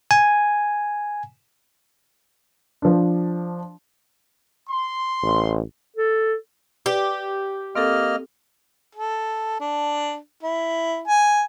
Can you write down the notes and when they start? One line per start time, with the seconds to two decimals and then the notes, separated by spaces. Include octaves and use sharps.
0.11 G#5
2.82 F3 D4
4.69 C6
5.23 A1
5.96 A4
6.86 G4 B4 D5
7.76 A#3 C4 A4 D#5 F6
8.95 A4
9.60 D4
10.43 E4
11.08 G#5